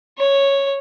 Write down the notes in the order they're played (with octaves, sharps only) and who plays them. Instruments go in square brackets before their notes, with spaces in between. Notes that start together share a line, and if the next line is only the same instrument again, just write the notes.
[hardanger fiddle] C#5